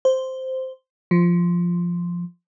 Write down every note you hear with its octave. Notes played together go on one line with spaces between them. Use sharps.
C5
F3